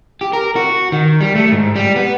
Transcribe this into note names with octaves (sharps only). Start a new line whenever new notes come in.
G4
A#4
F#4
D#3
G3
A3
G#2
G3
B3